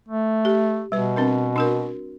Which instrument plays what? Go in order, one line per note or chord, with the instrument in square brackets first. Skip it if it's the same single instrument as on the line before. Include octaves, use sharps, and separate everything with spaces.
[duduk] A3
[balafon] G4
[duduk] B2 [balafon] G3 B4
[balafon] C4 D4 A#4
D4 F#4 A#4